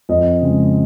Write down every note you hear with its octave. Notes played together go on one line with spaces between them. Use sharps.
F2 D#5
C#3 G#3